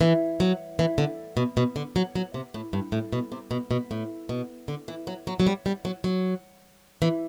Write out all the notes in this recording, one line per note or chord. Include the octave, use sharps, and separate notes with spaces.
E3
F#3
E3
D3
B2
B2
D3
F#3
F#3
C3
A2
G2
A2
B2
C3
B2
B2
A2
B2
D3
E3
F#3
F#3
F#3
G3
G3
F#3
F#3
E3